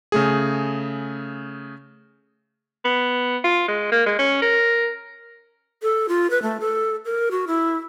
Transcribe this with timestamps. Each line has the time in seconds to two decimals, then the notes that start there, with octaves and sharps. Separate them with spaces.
0.12 C#3 A3 G#4
2.85 B3
3.44 F4
3.68 G#3
3.92 A#3
4.06 G#3
4.19 C#4
4.42 A#4
5.82 A4
6.09 F4
6.30 B4
6.42 A3
6.60 A4
7.05 A#4
7.31 F#4
7.47 E4